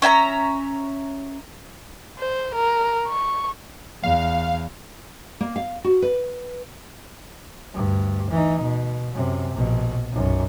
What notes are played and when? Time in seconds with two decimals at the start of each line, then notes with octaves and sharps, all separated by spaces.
0.02 C#4 E5 G#5 A#5
2.19 C5
2.55 A#4
3.08 C#6
4.03 E2 F5
5.41 A#3
5.56 F5
5.84 F#4
6.02 B4
7.72 D2 G2
8.30 E3 D#4
8.62 B2
9.14 F#2 C3
9.53 A#1 B2
10.12 B1 F#2